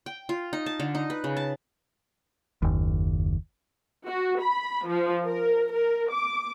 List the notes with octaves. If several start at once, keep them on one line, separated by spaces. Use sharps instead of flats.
G5
F4
D#4
A5
D3
D#4
B4
C#3
A5
F#1 D#2
F#4
B5
F3
A#4
A#4
D6